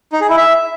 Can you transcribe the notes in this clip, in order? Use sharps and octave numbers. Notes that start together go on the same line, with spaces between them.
D#4
G#4
E4
E5